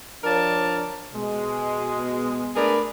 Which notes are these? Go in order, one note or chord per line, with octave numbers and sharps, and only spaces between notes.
F3 D4 A#4 C#5 D5 A5
B2 G#3
A3 D4 G#4 A#4 B4 D5